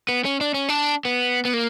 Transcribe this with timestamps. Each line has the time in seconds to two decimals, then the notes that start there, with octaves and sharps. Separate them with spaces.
0.09 B3
0.25 C#4
0.41 D4
0.54 C#4
0.69 D4
1.05 B3
1.45 B3
1.54 A#3